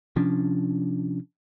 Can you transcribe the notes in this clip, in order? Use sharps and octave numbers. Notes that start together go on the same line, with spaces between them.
C3 F3 C#4 D4